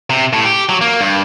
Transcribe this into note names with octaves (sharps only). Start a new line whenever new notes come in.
C3
A2
G4
F#3
A#3
G2